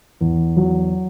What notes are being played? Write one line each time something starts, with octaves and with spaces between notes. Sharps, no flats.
E2
F#3